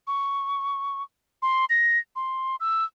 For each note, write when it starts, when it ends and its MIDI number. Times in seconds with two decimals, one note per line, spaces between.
0.07 1.03 85
1.42 1.65 84
1.70 1.98 94
2.16 2.56 84
2.60 2.84 88